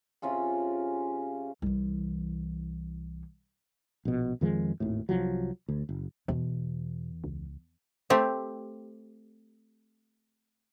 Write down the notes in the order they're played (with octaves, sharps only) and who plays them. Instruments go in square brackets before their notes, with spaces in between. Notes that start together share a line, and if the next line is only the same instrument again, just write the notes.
[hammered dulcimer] C3 C#4 F4 G#4
[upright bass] C2 E3
[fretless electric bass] A#1 B2
F2 D#3 F3 G#3
G#1 D#2 A2
C2 F3 F#3
D2
F#1
[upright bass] E2 [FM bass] B2
[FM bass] C#2
[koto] A3 C4 G4